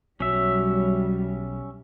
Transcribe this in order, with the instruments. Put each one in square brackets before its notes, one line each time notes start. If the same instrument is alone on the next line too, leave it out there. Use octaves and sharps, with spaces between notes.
[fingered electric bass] B1 [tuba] F#3 [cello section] G3 [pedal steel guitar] C#4 E5